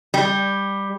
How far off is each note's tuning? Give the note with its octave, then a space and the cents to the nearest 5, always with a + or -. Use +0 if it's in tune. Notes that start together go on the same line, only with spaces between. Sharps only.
G3 +10